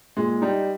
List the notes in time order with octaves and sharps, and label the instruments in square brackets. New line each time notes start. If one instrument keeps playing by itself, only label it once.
[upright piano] A#2 [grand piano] G#3
[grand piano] G3 [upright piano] D#4